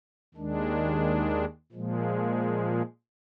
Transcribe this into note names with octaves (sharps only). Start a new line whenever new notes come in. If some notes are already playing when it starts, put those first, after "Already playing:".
D#2 D#3 G#3 D4
A#2 F3 G#3